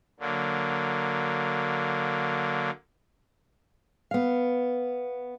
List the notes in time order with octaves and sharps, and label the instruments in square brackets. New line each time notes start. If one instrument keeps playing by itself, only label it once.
[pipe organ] D3 F#3 A#3
[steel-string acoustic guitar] B3 F5